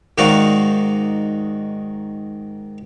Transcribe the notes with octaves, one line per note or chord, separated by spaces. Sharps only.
G#2 D#3 D#4 F#4 D5 F5